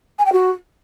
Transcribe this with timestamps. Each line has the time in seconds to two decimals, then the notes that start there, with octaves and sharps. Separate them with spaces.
0.19 G#5
0.26 G5
0.33 F#4